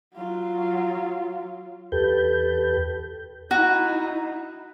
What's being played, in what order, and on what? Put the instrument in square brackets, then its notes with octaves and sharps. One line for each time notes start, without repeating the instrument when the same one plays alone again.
[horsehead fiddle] F#3 F4
[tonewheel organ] E2 G4 A4 B4 G6
[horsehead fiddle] D#4 E4 [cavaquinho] F#4